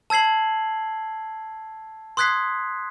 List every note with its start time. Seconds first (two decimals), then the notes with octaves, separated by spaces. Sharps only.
0.10 A5 E6 G#6 C7 F#7
2.17 C6 D#6 F#6 G#6 B6 C7